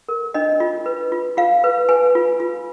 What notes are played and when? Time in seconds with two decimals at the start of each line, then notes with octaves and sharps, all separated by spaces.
0.08 A#4
0.34 D4 D#5
0.60 F4
0.86 B4
1.12 F4
1.37 F4 F5
1.64 B4
1.89 B4 G#5
2.15 F4
2.40 F4